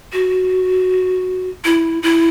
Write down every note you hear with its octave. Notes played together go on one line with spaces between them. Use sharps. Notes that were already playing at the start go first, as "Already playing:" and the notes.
F#4
E4
E4